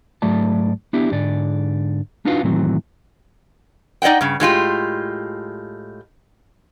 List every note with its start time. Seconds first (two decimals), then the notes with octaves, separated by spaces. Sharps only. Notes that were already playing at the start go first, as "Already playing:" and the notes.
0.22 G#2 F#3 A3 D5 A5
0.93 B3 D4 E4 G4
1.11 G#2 D3 D5
2.25 D4 D#4 F4 F#4 B4 F5
2.43 C2 A2 D#3 E3 F#3 C4
4.02 D#4 D5 D#5 F#5 G5
4.21 G2 C#3
4.40 A2 G#3 F4 G4